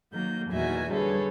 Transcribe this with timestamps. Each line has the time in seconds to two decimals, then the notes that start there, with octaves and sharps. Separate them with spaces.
0.13 D#3 F#3 A#3 G6
0.50 E2 A#2 D#3 F#4 E5 G#5
0.90 D3 G3 G#4 A4 B4 C#5